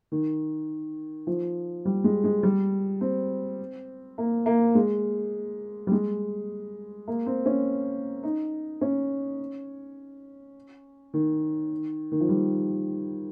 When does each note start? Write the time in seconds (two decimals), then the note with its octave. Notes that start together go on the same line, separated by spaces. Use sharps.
0.12 D#3
1.27 F3
1.85 G3
2.04 G#3
2.24 G#3
2.43 G3
3.01 C4
4.18 A#3
4.46 A#3
4.75 G#3
5.87 G3
5.92 G#3
7.08 A#3
7.26 C4
7.46 C#4
8.23 D#4
8.81 C#4
11.14 D#3
12.12 D#3
12.21 F3
12.29 G3